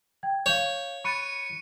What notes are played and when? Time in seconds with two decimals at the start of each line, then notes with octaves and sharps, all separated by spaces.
0.23 G5 G#6
0.46 C#5 F5 C#6 G6
1.04 B5 C#6 F#6 A6 C#7 D#7